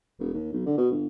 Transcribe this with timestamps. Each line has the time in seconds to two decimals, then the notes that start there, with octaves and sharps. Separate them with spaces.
0.19 E1
0.33 D#2
0.53 B1
0.66 D3
0.77 B2
0.91 G1